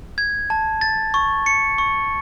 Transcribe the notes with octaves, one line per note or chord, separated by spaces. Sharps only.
G#6
A5
A6
C#6
C#7
C#6